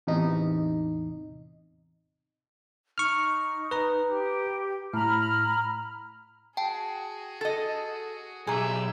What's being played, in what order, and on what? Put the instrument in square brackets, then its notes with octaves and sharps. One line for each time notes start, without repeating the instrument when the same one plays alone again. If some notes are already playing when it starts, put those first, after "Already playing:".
[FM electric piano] A1 E2 C3 D#4
[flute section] D#4 [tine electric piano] C#6 F6
[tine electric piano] B4 A#5
[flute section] G4
[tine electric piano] A2 [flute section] A#5 B5 F6
[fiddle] F#4 G#4 [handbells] G5 A5
[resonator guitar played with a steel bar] A4 D#5 [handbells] A6
[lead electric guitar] B1 [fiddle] G4 E5 [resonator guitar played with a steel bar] G#4 [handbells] G#5 A#5